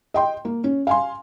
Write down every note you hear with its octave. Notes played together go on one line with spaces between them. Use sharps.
D#5 G5 C6
A#3
C#4
F5 G#5 C6